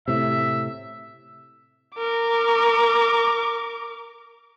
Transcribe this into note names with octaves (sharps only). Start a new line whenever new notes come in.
A2 C3 E5
A#4 D6